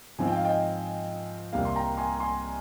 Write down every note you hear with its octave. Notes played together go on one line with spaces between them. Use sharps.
G#2 F3 C4 F4 G#5
G5
F5
D#5 G5
C2 C3 G3 A#3 F5
C6
G5 A#5
G#5 C6
G#5 C6